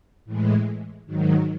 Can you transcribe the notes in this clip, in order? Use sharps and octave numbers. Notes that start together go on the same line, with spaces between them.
A2 E3 G#3
G#2 D#3 F#3